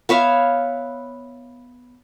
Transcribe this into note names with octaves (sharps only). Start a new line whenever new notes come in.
B3 C#5 E5 F5